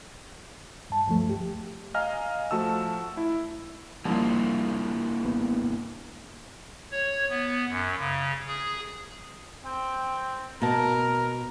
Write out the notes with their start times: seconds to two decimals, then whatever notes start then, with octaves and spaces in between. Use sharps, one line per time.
0.90 G2 A5
1.06 D2 G2 F3 A3
1.29 G4
1.94 D#5 F5 G#5 A#5 F6
2.51 F3 A3 F#4 A5 E6
3.17 E4
4.05 F2 A#2 G3 A#3 D4 E4
5.25 G#1 F#2 B3
6.92 C#5
7.29 B3
7.68 F#2
7.97 C#3
8.47 G#4
9.65 C4 G5
10.62 B2 A#4 A5 A#5